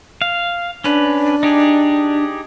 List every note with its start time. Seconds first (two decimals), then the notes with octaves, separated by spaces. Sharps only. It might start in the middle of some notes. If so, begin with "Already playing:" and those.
0.22 F5
0.84 C#4 D4 B4
1.43 D#4 G4 G#4